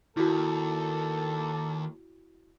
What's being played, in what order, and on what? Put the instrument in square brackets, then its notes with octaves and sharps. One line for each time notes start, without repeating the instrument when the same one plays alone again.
[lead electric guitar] D#2 [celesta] E4 F#4 [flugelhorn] A4